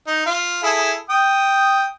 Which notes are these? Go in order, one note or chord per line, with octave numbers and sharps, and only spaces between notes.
D#4
F4
E4 G#4 A4
G5 D#6